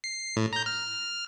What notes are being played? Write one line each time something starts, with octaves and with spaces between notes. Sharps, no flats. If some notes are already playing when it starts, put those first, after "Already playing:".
C7
A2
A#5 G6
F6